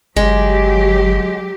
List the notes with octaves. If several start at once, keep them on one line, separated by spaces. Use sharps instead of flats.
G1 F#3 G#3 G4